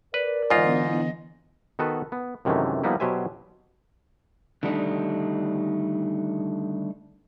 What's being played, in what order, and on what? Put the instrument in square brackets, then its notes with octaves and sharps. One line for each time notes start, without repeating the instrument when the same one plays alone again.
[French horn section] A#4 D5 [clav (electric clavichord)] B4
[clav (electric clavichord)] G#2 F4 [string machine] D3 E3 B3 [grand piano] D#5
[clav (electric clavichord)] D#3 B3 F#4 A4 B4
B3
F#2 C3 D#3 E3 G#3 A3
F3 G3 A#3 B3 D#4 E4
B2 F#3 G4 C5 E5 G#5
[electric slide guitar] D3 D#3 G3 A3 D4 D#4